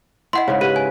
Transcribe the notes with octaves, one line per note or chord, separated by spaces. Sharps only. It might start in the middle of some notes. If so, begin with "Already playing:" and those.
E4 D#5 F#5 C6
G#2 C#3
G4 B4
G#5